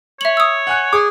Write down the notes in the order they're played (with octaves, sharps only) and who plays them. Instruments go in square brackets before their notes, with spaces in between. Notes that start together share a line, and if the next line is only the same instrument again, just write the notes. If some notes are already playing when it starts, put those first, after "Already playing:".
[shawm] C#5 [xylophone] E5 F#7
[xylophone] D#6 E6
[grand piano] F#5 G#5 F#6
[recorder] G#4 [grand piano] D6